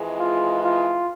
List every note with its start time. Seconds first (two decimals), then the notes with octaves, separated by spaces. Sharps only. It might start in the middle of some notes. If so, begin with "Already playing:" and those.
Already playing: F2 E3 G#3
0.19 F4
0.64 F4